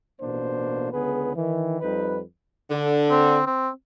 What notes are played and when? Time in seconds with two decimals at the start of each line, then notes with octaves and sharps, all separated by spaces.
0.21 A1 B2 A#3 D4 C5
0.92 C#2 D3 B3 G#4 B4
1.36 D#3 E3
1.80 F2 G3 D#4 B4
2.71 D3
3.11 C4
3.47 C4